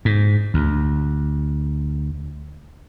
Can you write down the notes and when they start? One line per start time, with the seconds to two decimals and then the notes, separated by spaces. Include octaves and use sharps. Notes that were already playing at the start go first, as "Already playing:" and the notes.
0.05 G#2
0.54 D2